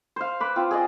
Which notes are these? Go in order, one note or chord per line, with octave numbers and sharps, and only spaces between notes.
C5 F5
B4 D6
C4 F4
G#4 D5 D#5